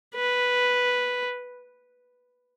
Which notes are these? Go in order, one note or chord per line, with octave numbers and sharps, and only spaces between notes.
B4